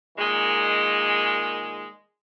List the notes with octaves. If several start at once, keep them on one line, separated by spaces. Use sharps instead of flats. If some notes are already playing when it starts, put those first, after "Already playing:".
A#2 D#3 G#3